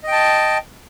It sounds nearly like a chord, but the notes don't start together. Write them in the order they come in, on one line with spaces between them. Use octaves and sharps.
D#5 G5 A5